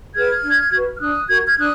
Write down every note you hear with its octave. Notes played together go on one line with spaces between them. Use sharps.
G#4 B4 F6 G#6
D4
F#4 B4
F6
D4 D#6 F#6
F#4 A#4 G#6
F6 G#6
D4 D#6 F#6